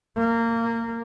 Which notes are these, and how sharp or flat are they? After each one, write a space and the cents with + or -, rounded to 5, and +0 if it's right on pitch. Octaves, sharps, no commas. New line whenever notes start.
A#3 -20